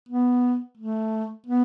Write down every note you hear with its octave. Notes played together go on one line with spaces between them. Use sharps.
B3
A3
B3